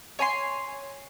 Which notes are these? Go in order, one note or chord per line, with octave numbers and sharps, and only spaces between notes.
C#5 G#5 A#5 C6